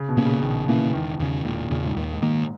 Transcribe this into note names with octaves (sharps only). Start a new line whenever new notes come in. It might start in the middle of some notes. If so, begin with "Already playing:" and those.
Already playing: C#3
B2
A#2 A#3 C#4
C#3
A#1 D#3
A#2 E3 A#3 C#4
E1 D#3
E2 C#3
E1 A#2
E2 A#2 C#3
G#2
D#2
G#2
D#3 A#3